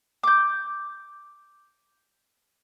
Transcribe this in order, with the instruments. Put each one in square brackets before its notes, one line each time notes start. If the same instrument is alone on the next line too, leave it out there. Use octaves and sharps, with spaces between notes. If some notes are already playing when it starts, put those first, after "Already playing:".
[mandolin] D6 G6